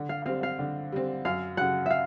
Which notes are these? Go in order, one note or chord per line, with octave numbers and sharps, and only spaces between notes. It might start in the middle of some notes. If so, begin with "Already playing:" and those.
Already playing: D3
F5
G3 C4 F5
F5
D3
G3 C4
F#2 F5
C#3 F#3 F#5
E5 F5